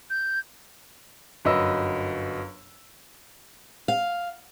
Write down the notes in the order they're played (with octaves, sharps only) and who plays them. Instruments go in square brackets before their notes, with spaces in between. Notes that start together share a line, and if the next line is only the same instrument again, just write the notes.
[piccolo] G6
[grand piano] G1 F#2 B4 D#5 E6
[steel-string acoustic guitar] F5